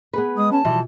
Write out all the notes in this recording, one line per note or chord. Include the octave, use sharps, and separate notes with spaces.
B3 G#4 B4
G#3 D#6
C#4 A5
B2 E3 F3 G3